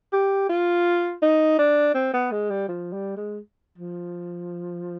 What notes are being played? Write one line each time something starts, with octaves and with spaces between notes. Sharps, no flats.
G4
F4
D#4
D4
C4
B3
G#3
G3
F3
G3
G#3
F3